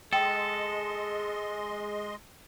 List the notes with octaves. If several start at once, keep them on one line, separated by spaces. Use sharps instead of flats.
G#3 G#4 A4 D#5 G5 C6